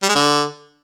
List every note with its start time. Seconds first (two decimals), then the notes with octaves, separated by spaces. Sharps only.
0.03 G3
0.09 G#3
0.15 D3